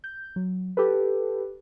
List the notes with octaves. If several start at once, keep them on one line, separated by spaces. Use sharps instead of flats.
G6
F#3
G4 A4 B4